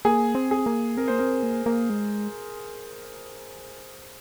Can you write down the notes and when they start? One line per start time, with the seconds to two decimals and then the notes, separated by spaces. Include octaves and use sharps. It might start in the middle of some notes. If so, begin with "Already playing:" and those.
0.05 A#3 G#4
0.35 C4
0.51 G#4
0.66 A#3
0.97 C4 A#4
1.08 A#3 C5
1.18 C4 A#4
1.43 A#3
1.66 A#3
1.90 G#3